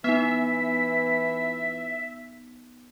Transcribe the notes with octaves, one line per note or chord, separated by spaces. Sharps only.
E3 B3 D#4 E5 B6